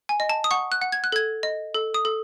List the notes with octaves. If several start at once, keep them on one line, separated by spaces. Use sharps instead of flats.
G#5
D#5
A5
D#6
F#5 C#6
F#6
F#5
G#6
F#6
A4 G#6
D#5
A4
D#6
A4